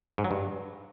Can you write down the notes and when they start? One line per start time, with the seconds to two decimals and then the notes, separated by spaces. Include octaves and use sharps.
0.18 G#2
0.24 F#3
0.31 G2